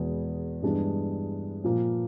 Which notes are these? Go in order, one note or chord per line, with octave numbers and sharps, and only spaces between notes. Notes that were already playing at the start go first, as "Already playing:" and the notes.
Already playing: E2 B2 G#3 B3
G2 E3 G#3 B3 D4
A#2 F3 A#3